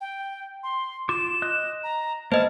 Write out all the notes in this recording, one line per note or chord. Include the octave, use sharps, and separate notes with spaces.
G5
C6
F4 C6 D6 E7
D#5 D#6 F#6
A#5
A#3 B3 C5 D#5 E5 A5 F6